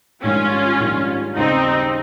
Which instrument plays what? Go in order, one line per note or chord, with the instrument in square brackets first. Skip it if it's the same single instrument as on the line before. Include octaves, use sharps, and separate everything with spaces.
[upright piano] A#1 G#2 D#3 G3 [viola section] C#4 F4
[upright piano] A#1 G#2 D#3 G3
[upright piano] D#2 C#3 G3 [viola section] C4 D#4